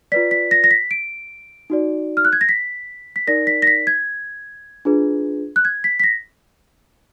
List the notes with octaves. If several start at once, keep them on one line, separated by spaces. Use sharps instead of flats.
F4 B4 D5 B6
B6
A#6
A#6
B6
D7
D#4 F#4 D5
F6
F#6
G#6
A#6
B6
B6
D#4 A#4 D5 A#6
B6
A#6
B6
G#6
D4 F4 G#4 B4
F#6
G#6
B6
B6
A#6